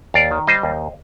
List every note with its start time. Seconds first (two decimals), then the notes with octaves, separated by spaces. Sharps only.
0.14 D#2 D5 F5
0.31 D#3
0.47 G3 C5 D#5
0.63 D#2